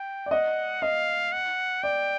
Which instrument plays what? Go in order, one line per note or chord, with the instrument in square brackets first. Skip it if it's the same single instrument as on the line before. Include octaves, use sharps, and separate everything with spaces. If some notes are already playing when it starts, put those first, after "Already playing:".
Already playing: [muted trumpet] G5
[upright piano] D5
[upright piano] D#5 [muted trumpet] F#5
[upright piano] D#5 [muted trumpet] F5
[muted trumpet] F#5
[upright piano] D5 [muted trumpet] G5